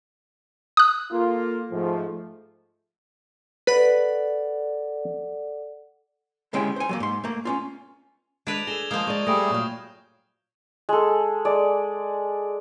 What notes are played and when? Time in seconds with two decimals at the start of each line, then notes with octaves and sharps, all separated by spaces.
0.77 D#6 F#6
1.12 A#3 F4 A4
1.71 G#2 F3 A3
3.67 A4 B4 D5 F#5
6.53 D2 C3 G#3 C#4 E4 G5
6.76 C5 G#5
6.89 F#3 A3 A#3
7.00 G#2 C6
7.24 A3 A#3
7.45 C#4 D4 F4
8.47 G#3 D4 B4 G#6 D7 F7
8.67 G#4 A4 A#6 E7 G7
8.91 F3 G#3 A#3 G#4 D#6 G6 F7
9.07 G#3 D5 C#6
9.27 G3 A3 G#4 A#6 D7
9.50 A#2 F#3 F5
10.89 G#3 A4
11.45 G#3 D5